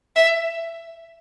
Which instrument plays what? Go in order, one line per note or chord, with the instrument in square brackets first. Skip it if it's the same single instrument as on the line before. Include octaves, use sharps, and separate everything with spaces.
[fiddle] E5